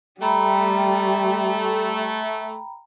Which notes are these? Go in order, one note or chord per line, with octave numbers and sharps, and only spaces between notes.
G3 A3 G5 A#5 B5